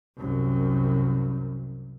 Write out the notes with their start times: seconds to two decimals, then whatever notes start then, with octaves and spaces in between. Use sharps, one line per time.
0.17 C2 F#2